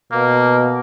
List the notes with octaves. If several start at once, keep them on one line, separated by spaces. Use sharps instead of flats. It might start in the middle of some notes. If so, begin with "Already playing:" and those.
B2 A#3